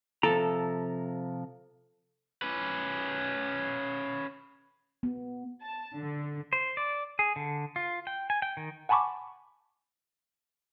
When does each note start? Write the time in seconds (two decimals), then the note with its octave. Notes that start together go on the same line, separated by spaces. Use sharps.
0.23 C3 F3 A4 A#5
2.42 C#4 B4
5.03 B3
5.61 A5
5.97 D3
6.53 C5
6.77 D5
7.19 G#4
7.36 D3
7.76 F4
8.07 G5
8.30 G#5
8.42 G5
8.57 D#3
8.89 F#5 G#5 A5 B5 C#6 D6